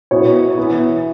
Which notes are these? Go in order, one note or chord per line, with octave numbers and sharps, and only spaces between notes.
B2 B3 E4 C#5
E3 B3 E4